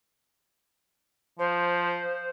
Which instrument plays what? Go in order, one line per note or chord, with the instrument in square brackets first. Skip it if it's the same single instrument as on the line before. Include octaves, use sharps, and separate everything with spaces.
[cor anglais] F3 [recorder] C5